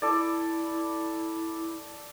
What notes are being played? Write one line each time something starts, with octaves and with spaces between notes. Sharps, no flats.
E4 A4 D5